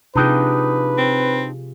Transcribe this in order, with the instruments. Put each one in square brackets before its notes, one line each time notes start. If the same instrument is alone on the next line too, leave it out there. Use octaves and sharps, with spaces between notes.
[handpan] C3 F4 G#4 [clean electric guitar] D4 D#4 G5 [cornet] B4
[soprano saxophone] C4